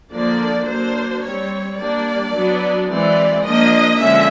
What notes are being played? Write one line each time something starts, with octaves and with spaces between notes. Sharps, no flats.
D3 F3 A#3 D4 D5
F#3 A#3 D4 C5
G3 C4 C#5
G3 A#3 D4 D5
F#3 B3 D4
E3 G#3 C4 D5
F3 A#3 D4 D#5
D3 F3 G#3 C#4 E5